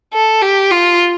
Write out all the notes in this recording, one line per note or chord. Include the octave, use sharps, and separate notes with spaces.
A4
G4
F4